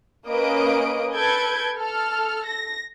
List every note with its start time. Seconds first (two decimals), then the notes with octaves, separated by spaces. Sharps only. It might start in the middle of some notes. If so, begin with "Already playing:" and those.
0.28 A#3 C#4 B4 D#5 D#6 D7
1.14 A4 B4 G6 G#6 D7
1.76 A4 F6
2.47 A#6